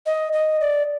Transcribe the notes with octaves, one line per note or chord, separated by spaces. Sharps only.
D#5
D#5
D5